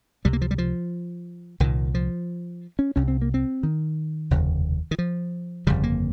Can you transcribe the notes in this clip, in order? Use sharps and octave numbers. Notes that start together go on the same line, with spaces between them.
C#2 C3 G3
A#3
F3
G3
F3
C2 A#2 D#3
F3
C#4
C2 C3 C#4
C4
A#3
C4
D#3
F1 D#2 C#3
D#3
F3
G1 F2 C#3 G3
A#3